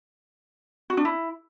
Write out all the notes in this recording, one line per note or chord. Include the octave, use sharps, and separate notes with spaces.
F#4
D4
E4